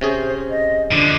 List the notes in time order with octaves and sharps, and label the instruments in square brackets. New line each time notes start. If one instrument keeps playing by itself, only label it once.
[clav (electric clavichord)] C3 C#4 G#4 [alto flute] C5
[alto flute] D#5
[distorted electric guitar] D3 F3 [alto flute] D4